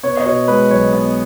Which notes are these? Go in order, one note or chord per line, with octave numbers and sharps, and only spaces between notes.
B3 C#5
D#5
B2 C#5
G#3 B4
B1 C#5
B3